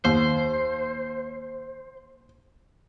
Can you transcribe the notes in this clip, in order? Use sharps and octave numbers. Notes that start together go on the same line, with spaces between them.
D#2 C5